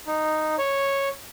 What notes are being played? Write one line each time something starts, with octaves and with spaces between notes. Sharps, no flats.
D#4
C#5